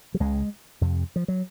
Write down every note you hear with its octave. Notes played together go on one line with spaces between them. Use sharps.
F#3
C#2 C#3 G#3
F2 C3
F3
F#3